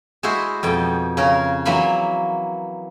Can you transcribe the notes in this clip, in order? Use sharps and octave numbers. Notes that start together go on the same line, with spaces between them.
G#3 E4 F#4 C5
F2 B2 G5
C#3 C#4 A#4
E3 F#3 A#3 E5 B5 C6